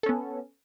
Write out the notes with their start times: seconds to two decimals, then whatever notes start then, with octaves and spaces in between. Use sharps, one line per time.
0.03 A4
0.06 C#4
0.09 B3